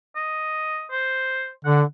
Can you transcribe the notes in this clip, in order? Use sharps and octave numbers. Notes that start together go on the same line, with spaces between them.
D#5
C5
D3 F#5